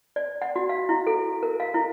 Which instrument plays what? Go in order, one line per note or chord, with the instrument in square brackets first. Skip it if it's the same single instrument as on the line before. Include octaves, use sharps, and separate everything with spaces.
[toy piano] D5
F#5
F#4
F5
E4
A4
A#4
F5
E4